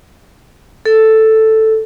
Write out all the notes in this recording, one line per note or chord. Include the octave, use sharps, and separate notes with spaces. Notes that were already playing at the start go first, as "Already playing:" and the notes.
A4